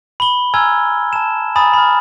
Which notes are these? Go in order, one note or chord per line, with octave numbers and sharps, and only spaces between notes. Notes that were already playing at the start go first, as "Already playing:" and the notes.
B5 G7
G#5 A#5 E6 F6 G#6
A5 E7
G#5 A#5 B5 D#6 A6
B5 F6